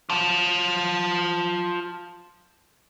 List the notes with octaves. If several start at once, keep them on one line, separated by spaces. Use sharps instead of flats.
F4 A5